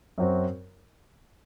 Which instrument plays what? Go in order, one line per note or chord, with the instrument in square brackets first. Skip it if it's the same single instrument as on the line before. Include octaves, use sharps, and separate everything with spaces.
[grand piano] F#2 F#3 C4 F#4 C5